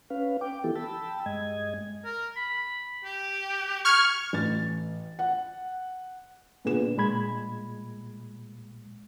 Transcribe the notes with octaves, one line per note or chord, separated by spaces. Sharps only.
C#4 B4 F5
G5 D6
E3 B3 E4 G4 A4
G5 A5 B5 E6
G2 G#3 D#5 G#6
A#4
B5
G4
C#6 F6 G#6
A1 A6
F#5
A#2 D3 B3 G#4 E7
A#2 G#3 B5 G#6